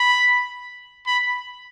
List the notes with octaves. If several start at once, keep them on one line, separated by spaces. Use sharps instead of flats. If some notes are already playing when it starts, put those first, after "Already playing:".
Already playing: B5
B5